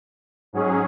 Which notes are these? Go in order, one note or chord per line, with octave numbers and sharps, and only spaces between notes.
G#2 F#3 C#4 G#4